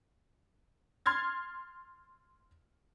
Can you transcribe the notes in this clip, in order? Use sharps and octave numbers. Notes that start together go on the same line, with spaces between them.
C6 F6 G#6 A6